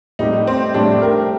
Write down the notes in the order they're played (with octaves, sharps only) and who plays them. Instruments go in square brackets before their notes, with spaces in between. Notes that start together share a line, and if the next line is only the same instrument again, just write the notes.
[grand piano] A2 G3 C4 G4 [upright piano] D#4
[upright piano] C4
[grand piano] A2 G3 C4 G4 [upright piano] D4
[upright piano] A#4